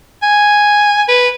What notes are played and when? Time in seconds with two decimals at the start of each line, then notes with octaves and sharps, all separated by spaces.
0.23 G#5
1.09 B4